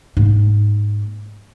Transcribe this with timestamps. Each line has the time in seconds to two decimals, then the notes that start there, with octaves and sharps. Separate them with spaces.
0.17 G#2 A#3